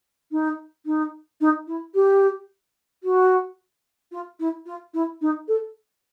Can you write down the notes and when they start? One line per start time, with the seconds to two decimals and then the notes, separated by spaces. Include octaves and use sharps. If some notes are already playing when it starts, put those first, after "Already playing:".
0.32 D#4
0.86 D#4
1.41 D#4
1.67 E4
1.95 G4
3.04 F#4
4.12 F4
4.40 E4
4.66 F4
4.94 E4
5.22 D#4
5.48 A4